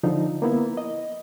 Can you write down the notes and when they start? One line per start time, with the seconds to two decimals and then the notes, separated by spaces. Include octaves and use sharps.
0.04 D3 F3 D#4
0.42 A#3 B3 E4
0.77 D#5